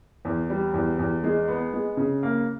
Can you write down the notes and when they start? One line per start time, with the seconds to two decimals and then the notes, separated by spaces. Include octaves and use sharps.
0.25 E2
0.50 G3
0.74 E2
0.99 E2
1.24 G#3
1.48 B3
1.74 G#3
1.97 C#3
2.23 A#3